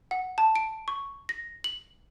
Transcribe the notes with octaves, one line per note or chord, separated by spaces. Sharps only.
F#5
A5
D7
C#6
A#6
F#7